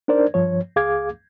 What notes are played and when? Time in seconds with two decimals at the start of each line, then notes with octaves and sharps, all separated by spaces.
0.08 D4 D#4 A#4 C5 D5
0.34 G2 F3 C#5
0.76 C#2 G#4 F5 D6 G#6